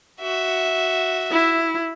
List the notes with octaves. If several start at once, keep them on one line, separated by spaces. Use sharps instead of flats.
F#4 E5
E4